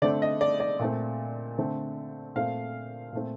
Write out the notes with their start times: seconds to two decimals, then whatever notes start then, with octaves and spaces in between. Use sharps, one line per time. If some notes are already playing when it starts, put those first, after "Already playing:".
0.02 D3 A3 C4 D5
0.22 D#5
0.41 D5
0.60 D5
0.79 A#2 A3 C4
1.58 D3 A3 C4
2.35 A#2 A3 C4 F5
3.12 A#2 A3 C4